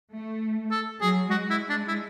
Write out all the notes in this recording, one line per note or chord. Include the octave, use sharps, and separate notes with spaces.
A3
A4
F#3 G#4
G#3 F#4
E4
D4
E4